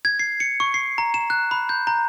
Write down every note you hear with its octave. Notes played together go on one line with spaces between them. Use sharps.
G#6
C7
C#7
C#6
C7
A#5
E7
F#6
B5
G6
A#5